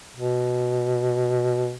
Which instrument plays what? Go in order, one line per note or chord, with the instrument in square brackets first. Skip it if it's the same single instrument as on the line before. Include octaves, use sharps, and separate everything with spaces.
[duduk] B2